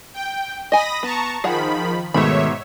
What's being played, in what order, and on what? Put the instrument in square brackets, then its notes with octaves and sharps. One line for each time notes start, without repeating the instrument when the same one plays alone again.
[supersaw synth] G5
[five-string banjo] D#5 G#5 [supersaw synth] B5 D#6 A#6
[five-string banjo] B3 [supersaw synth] A5 A#5 C#6
[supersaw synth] D#3 F3 B5 [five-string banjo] G#4 F#5 A#5
[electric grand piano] G#2 B2 [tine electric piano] D#3 [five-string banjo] A3 B5 [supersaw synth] C#5 E5